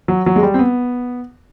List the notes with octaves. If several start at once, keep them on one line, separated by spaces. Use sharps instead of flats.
F#3
F#3
G#3
G3
C4
B3